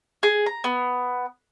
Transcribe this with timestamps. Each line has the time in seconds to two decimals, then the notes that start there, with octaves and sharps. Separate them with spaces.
0.23 G#4
0.46 A#5
0.64 B3